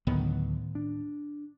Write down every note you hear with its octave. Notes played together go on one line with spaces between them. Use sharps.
D2 A2 D3 D#3 F#3 B3
D4